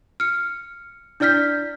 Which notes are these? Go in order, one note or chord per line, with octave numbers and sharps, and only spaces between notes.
F6 C#7
D4 E4 D5 F6 G6 B6